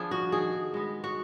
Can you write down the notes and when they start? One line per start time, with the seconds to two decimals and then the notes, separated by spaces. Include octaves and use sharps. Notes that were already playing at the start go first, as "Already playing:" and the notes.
Already playing: F3 B3 D4 G#4
0.11 F#4
0.32 D#3 G#4
0.74 G#3 B3
1.04 F#4